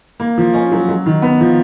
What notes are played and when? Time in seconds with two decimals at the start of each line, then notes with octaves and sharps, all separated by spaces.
0.20 A#3
0.37 F3
0.54 C#4
0.72 F#3
0.88 F#3
1.06 D#3
1.22 B3
1.41 F3